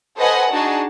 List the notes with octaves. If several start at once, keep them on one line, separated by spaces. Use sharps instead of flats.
A4 B4 C5 D#5 F#5 G#5
D4 D#4 F#4 G#4 A5